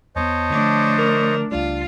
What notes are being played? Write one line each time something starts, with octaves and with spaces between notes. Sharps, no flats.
E2 A#3 B3 C5 C#5 D#5 A5
D3 F3 A3 D4
A#4
C#2 G3 D4 F4